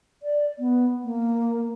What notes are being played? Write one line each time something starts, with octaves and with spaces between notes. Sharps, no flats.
D5
B3
A#3